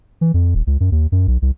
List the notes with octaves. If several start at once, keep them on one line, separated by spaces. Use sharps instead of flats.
E3
F2
D#1
C#2
F#2
D#2
F#2
B1
C2